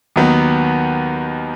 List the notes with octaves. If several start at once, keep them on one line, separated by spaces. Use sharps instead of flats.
D#2 D#3 F#3 B3